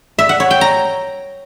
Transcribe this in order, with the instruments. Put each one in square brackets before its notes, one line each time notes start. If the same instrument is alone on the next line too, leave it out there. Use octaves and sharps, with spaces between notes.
[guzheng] E5
F#5
C#5
G5
A#5